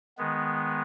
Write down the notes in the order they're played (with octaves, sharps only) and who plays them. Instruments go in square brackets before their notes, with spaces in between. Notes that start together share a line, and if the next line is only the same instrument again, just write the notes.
[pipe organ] D#3 G#3 B3